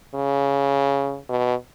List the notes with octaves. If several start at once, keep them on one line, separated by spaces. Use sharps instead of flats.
C#3
B2